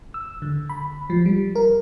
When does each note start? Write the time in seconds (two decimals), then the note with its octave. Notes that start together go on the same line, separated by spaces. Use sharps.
0.14 E6
0.42 D3
0.70 B5
1.10 F3
1.26 G3
1.55 A#4